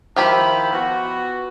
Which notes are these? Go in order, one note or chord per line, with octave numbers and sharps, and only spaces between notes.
D#3 F3 E4 G4 A5 B5
B3 F#4